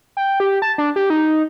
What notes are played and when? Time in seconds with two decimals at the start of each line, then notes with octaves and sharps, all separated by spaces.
0.17 G5
0.40 G4
0.62 A5
0.78 D4
0.96 G4
1.10 D#4